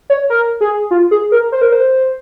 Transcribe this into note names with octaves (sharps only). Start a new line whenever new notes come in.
C#5
A#4
G#4
F4
G#4
A#4
C5
A#4
C5